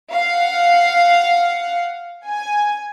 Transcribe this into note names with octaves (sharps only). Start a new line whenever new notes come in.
F5 F#5
G#5